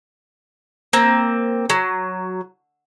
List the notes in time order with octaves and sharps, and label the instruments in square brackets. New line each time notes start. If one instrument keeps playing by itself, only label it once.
[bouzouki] A#3 C4
F#3